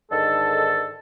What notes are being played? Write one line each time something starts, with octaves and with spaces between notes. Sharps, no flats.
G#2 D3 D#3 A4